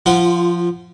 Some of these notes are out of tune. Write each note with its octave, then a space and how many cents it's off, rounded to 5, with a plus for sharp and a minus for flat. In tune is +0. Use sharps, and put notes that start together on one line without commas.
F3 +0 F4 -25 F#5 +0